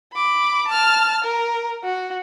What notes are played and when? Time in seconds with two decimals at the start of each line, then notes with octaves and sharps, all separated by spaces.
0.13 B5 D6
0.68 A5 F6
1.24 A#4
1.84 F#4